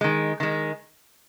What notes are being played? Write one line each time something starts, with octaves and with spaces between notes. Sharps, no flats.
D#3 G#3
D#3 G#3